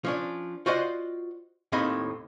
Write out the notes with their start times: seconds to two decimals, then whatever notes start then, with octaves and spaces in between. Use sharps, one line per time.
0.04 F3 C#4 D4
0.66 F4 F#4 C5 D5 D#5 F#5
1.72 D#2 A2 D#3 C4 D#5 B5